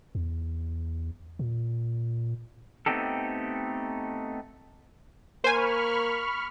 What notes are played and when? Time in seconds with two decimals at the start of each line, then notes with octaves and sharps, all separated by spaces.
0.15 E2
1.39 A#2
2.86 A3 B3 C4 D#4 G4 A4
5.44 A#3 C5 G#5 B5 C#6 F6